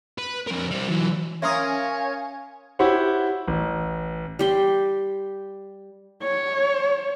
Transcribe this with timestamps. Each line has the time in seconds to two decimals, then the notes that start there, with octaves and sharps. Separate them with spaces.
0.18 B4
0.47 F2 A#4
0.71 G3 C4
0.87 E3 F#3
1.42 C#4 A#4 C#5 E5 F5 G#5 C6 D#6
2.79 E4 F#4 G4 C5 C#5 F#5
3.47 A1
4.39 G3 G4 C6
6.23 C#5